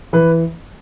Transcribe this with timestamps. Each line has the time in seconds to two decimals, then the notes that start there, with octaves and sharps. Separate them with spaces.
0.13 E3 B4